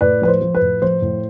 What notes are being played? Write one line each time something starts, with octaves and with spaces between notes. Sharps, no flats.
A2 B4 D5
F3 B4
C5
F3
B4
A2
F3 C5
A2